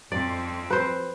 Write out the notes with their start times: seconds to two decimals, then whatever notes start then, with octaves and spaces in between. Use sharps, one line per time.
0.12 F2 C4 D5
0.70 B4 C5